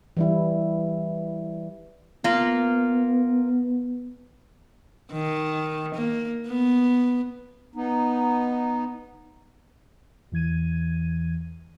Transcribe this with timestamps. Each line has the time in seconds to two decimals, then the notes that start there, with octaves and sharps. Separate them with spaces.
0.17 E3 G3 E4
2.24 A#3 B3 F4
5.11 D#3
5.95 A#3
6.47 B3
7.75 B3 D#4
10.32 E2 E3 G#6 D#7